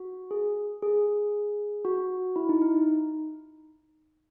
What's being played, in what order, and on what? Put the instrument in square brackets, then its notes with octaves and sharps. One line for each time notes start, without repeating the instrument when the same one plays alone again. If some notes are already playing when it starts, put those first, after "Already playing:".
Already playing: [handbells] F#4
G#4
G#4
F#4
E4
D#4
D#4